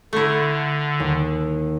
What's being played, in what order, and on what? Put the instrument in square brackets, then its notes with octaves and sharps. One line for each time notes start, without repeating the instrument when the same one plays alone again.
[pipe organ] D3 [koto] A3 E4
[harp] D#2